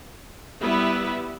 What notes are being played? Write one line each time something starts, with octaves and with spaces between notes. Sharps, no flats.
G3 B3 E4 B4 E5